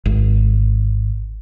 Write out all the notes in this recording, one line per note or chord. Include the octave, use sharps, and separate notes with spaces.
G#1